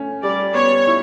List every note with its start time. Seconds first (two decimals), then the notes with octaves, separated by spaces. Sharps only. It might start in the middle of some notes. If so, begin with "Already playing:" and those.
Already playing: A3 C#4
0.23 G3 D5
0.54 B3 C#5
0.87 E4